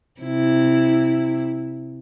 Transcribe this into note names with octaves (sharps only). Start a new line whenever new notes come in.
C3 E4